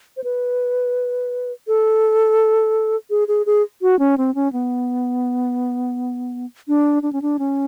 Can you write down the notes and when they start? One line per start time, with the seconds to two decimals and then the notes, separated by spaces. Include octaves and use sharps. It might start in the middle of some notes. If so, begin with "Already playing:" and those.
0.17 C5
0.24 B4
1.68 A4
3.10 G#4
3.28 G#4
3.46 G#4
3.82 F#4
3.99 C#4
4.18 C4
4.35 C#4
4.53 B3
6.68 D4
7.03 D4
7.13 C#4
7.22 D4
7.39 C#4